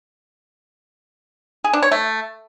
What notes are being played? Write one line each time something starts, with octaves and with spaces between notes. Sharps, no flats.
G#4
D4
C#5
A3